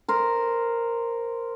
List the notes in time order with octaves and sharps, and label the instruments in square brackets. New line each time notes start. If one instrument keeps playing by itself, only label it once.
[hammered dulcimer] A#4 C5